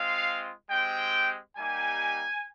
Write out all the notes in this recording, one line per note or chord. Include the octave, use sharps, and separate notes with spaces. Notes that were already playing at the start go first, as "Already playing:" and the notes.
Already playing: G#3 C4 F4 F5
G#3 C4 G4 G5
G3 A#3 D#4 G4 G#5